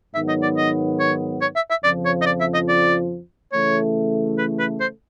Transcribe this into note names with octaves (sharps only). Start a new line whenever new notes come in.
G#2 D#3 F#3 B3 E5
D#5
D5
D#5
C#5
C#5
E5
E5
F2 C#3 F3 D5
C#5
D#5
D5
E5
D#5
D5
C#3 E3 A3 C#5
B4
B4
C5